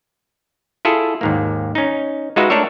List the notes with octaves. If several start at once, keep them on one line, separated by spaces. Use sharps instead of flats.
E4 F4 G#4 A4
D#2 G#2 A#3
C#4 D#4
G#3 D#4 F4 F#4 B4 E5
A3 D4 A4 A#4 C#5 E5